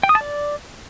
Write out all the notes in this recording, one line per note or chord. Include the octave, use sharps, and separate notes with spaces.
G5
D#6
A5
D5